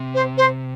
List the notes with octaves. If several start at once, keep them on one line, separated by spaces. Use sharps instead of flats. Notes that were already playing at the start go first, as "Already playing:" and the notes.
Already playing: C3
C5
C5